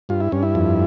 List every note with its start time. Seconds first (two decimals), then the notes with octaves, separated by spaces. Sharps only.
0.09 G2 F4
0.20 E4
0.32 G2 C#4
0.43 E4
0.55 F2